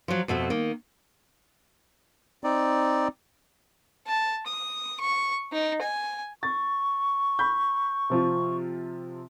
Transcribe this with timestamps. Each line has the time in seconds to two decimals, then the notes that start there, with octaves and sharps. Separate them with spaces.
0.08 F3 F#3
0.28 F2 B2 A3 F#4
0.50 D#3 A#3
2.44 C4 D#4 D5
4.07 A5
4.47 D#6
5.01 C#6
5.52 D#4
5.82 G#5
6.43 C#6 A6
7.39 B5 G6
8.10 C3 F3 F4